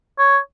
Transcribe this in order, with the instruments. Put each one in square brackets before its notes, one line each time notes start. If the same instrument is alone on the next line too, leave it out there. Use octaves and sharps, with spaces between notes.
[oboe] C#5